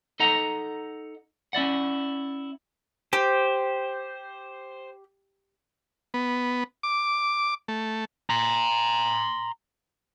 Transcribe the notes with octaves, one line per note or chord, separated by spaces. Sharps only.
D#4 A4 D#5 F#5 A#5
C#4 E4 D5 F#5
G4 C5
B3
D6
A3
A#5 C6